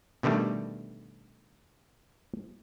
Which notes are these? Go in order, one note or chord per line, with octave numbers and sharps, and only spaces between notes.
B2 D3 D#3 G3 A3